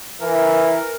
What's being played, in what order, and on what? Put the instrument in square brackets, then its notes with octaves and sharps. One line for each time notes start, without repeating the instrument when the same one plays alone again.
[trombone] E3 [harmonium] A#4